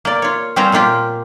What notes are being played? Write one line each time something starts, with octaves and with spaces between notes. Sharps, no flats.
A#3 D5
F4 C#5
G3 C4 C#4 F4 C5 A#5
A#2 A#3 F4 G4